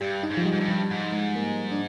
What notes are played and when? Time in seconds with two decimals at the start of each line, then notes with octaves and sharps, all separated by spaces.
0.01 G2 G4
0.23 D#4
0.30 G#2
0.37 F3
0.45 G3
0.52 G#2
0.60 G2
0.68 F3
0.90 G#2
1.12 G#3
1.36 A#3
1.72 D4